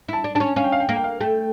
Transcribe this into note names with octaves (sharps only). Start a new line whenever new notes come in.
E4 A5
D4
D4 A5
C#4
C#4 F5
G5
F5
G5
A#3 F5
G5
F5
A3 G5